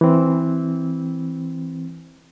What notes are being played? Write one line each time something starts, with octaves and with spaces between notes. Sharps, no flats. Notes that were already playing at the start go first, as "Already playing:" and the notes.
E3 C4